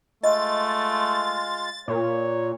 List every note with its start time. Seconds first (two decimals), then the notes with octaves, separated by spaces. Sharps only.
0.23 G#3 A3 F4 D#5 A6
1.88 A#2 C#5